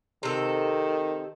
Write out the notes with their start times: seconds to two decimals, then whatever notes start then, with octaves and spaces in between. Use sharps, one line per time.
0.23 C3 D#3 A4